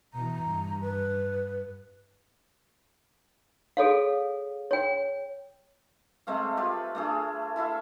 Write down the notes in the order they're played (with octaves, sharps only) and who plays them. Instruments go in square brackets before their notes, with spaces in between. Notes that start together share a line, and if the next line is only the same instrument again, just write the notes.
[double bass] B2 E3 [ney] A#5
[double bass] G2
[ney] B4
[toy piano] G#4 A4 C#5 F5
C#5 G5
[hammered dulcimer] G#3 A3 C4 F5
F4 G4 B4
A3 D4 G#4
E4 A4 E5 F5